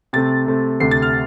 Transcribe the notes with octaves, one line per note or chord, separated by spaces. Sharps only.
C3 A3 C4 A6
C3 A3 C4
D2 C3 A3 C7
A6
F6